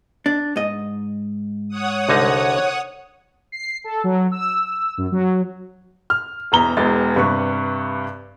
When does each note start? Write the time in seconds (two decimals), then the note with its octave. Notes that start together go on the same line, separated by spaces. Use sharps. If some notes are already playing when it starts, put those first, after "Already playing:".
0.26 D4
0.56 G#2 D#5
1.68 C#5 F#5 D#6
2.09 C2 D3 D#4
3.52 C7
3.84 A4
4.04 F#3
4.32 E6
4.98 F#2
5.12 F#3
6.10 F6
6.52 E1 E2 A#5 G7
6.77 E1 E2 G#3 A6
7.16 G2 C3 B4 C#6